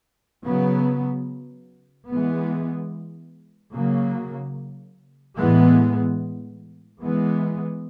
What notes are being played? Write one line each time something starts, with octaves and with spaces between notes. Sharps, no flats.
C#3 F#3 B3
E3 G#3 B3
C#3 F#3 A#3
A2 E3 G#3 B3
E3 G#3 B3